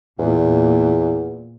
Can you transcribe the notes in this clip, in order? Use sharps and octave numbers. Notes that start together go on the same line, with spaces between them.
E2 A#2